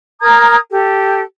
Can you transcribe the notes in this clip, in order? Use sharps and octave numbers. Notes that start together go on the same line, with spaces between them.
A#4 A#5 D#6 G#6
G4 A4